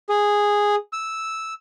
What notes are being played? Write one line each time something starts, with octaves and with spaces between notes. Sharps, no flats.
G#4
E6